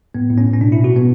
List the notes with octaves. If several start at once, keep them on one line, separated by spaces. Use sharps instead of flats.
A2 B3
A2
C#4
A2
C#4
B2 D4
B2 E4
F#4
B2 B3